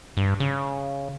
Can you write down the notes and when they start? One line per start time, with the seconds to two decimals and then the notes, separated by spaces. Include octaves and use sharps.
0.17 G2
0.40 C#3